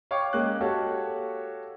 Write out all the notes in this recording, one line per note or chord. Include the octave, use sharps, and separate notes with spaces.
C#5 F5 G5 C#6 D6
G#3 A#3 C#4 G5 F#6
F#4 G4 A4 C#5 F5